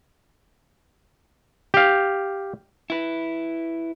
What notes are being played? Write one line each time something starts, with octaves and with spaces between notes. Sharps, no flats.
G4 F5
E4 B4